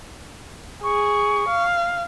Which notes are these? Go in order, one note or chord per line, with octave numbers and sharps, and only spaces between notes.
G#4 C#6
F5